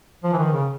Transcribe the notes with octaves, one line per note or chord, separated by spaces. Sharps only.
F3
E3
D#3
C#3